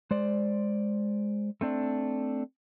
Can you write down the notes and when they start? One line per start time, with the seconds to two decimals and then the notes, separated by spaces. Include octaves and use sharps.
0.11 G#3 C5 D5
1.61 A3 C4 D4